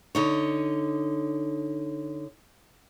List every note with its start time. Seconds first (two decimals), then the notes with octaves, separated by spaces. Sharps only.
0.15 D3 D#4 C#5